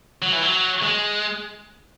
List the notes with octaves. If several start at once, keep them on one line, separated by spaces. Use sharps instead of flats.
F#3
E3
F#3
G#3